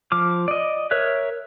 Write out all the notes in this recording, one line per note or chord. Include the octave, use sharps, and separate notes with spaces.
F3 D6 F6
D5 D#5
A#4 C#5 E5 F#6